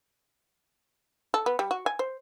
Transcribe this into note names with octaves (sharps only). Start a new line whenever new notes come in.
A4
B3
G3
F#4
G#5
C5